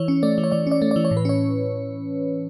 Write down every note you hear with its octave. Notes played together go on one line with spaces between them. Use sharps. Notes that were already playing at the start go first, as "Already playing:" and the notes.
Already playing: E3 C#5
C#4
A3 D5
E3
C#5
E3 D5
C#4 D5
A3
E3 D5
C#5
A2
B4
C#4 C#5